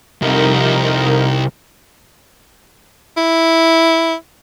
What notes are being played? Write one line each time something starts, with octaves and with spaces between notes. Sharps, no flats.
C2 F2 D#4 A#4
E4